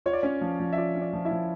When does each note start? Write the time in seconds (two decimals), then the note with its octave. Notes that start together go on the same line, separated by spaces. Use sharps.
0.06 F4 C#5
0.13 D5
0.23 C#4 C#5
0.41 F3
0.60 F3
0.73 E5
0.77 F4 D5
0.95 C#4
1.01 D5
1.13 F3
1.25 E4 E5
1.31 F3